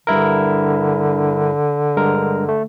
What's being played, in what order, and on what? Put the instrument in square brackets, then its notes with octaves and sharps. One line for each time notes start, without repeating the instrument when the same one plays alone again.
[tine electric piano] G2 E4 A#4 [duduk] D3
[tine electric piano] G2 G#3 A#4
A3